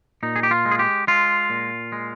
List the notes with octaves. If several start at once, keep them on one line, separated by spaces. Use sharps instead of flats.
A#2 D#4
G#4
G4
F4
G#3
G#4
G4
G#3 F4
A#2
G#3